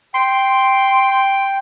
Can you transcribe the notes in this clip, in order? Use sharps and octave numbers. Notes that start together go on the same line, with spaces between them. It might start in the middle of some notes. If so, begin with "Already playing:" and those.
G5 C6